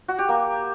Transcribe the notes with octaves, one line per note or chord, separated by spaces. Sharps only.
F#4
G4
A#3